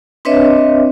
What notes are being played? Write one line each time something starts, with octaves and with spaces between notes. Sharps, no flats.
C4 D4 B4 C#5 D#5 E5